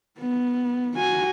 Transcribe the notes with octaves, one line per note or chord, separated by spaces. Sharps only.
B3
F#4 G#5